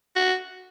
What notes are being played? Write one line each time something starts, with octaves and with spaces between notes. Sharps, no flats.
F#4